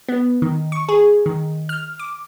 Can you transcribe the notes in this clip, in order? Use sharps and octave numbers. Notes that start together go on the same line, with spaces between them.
B3
D#3
C#6
G#4
D#3
F6
D6